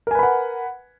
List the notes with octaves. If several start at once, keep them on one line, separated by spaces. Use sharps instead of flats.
A#4 B4 F#5 G#5 B5